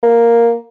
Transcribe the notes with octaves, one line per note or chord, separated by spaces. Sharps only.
A#3